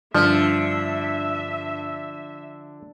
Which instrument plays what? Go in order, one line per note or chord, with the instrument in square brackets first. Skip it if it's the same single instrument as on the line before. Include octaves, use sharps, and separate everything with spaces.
[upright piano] G2 [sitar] D3 [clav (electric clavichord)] F3 [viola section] E5